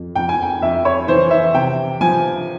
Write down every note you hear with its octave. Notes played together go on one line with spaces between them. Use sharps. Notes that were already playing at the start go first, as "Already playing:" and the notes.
Already playing: F2
F2 G5
G#5
G5
F2 E5
C#5
E3 C5
E5
C3 G5
F3 G#5